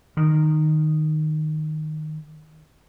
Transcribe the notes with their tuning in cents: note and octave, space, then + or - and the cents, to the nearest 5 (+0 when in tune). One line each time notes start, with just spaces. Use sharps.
D#3 -10